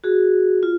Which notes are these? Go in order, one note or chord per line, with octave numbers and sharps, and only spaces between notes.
F#4 G#4
F4